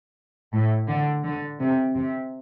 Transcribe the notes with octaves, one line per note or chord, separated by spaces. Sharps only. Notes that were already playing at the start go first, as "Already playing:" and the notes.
A2
D3
D3
C3
C3